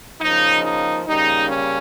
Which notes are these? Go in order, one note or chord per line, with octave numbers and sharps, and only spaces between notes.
C#3 F3 A#3 D#4
D#4
C#3 G3 A#3 D#4
C#4